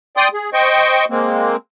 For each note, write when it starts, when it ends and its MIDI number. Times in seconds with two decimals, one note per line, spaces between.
0.17 0.28 74
0.17 0.28 79
0.17 0.28 84
0.17 0.28 87
0.34 0.50 68
0.53 1.05 72
0.53 1.05 75
0.53 1.05 79
0.53 1.05 85
1.10 1.56 56
1.10 1.56 58
1.10 1.56 60